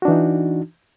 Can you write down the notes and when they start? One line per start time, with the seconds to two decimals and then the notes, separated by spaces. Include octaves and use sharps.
0.02 F#4
0.05 D4
0.08 E3
0.11 D#4